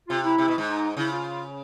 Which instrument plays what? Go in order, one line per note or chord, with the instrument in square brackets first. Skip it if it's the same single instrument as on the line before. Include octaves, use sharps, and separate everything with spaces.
[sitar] C3 [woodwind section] F4
[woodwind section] E4
[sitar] C3
B2
G#2
[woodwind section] D#4
[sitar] C#3 [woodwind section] E4
[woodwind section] F4